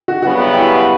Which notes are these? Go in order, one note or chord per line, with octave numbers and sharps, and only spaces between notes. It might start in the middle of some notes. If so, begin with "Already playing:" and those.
F#4
F#2 C#3 G3 B3 F#4
F#4
E4 G4